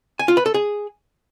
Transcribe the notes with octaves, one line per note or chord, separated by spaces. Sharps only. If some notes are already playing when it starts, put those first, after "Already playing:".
G#5
F4
B4
A4
G#4